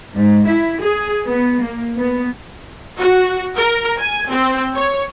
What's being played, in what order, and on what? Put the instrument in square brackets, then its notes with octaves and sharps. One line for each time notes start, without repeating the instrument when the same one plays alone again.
[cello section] G#2
E4
G#4
B3
A#3
B3
[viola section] F#4
A#4
G#5
C4
C#5